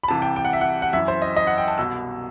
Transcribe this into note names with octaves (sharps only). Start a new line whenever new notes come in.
B5
C2 C3 E3 A5
G5
G5
F#5
E5
F#5
F#5
F#2 E3 E5
C5
D#5
D#5
F#5
G5
A5
C2 B2 E6